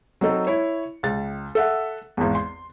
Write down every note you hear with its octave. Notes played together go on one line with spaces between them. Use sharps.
F#3 C4 D#4 A4
E4 C#5
C#2 A6
A4 E5 F#5
G#1 E2
C6